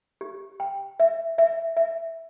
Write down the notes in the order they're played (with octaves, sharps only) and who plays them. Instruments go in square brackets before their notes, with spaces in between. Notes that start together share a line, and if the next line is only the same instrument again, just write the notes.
[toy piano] G4
G5
E5
E5
E5